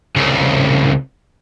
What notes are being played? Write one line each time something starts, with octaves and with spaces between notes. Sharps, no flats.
C2 C#3